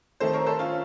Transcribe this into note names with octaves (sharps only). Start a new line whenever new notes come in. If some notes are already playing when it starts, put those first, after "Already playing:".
D#3 A3 C4 A4 C5
A#4 C#5
A4 C5
C#4 F4